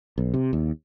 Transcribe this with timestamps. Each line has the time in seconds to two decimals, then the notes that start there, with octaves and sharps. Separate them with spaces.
0.18 B1
0.34 C3
0.53 D#2